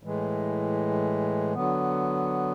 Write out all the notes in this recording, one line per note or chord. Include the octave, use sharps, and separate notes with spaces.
A2 E3 G#3
D3 F#3 B3